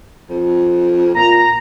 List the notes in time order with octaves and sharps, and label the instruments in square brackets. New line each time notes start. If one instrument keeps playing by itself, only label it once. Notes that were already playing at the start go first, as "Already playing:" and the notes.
[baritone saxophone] F2
[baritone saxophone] A#2 [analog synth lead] A#5